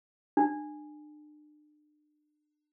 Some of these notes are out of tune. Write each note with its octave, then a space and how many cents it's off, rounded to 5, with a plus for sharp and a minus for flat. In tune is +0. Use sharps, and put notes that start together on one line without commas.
D4 +40